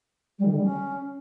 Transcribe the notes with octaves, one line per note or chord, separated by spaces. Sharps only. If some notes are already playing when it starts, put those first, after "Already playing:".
G3
D#3
D3
G3
C#4